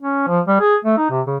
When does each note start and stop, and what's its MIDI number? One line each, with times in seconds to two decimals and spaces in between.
0.02 0.23 61
0.28 0.40 53
0.47 0.57 55
0.60 0.76 68
0.85 0.97 57
0.98 1.06 63
1.10 1.21 48
1.27 1.37 49